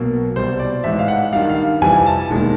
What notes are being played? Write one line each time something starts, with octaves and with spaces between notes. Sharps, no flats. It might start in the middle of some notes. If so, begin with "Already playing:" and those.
Already playing: B1 B2 F#3 A#3
C2 B2 G3 C5
D5
A1 G#2 E3 G#3 E5
F5
F#5
G2 D#3 G3 F5
F5
F2 C3 E3 G3 G#5
A5
E1 D#2 D#3 G#3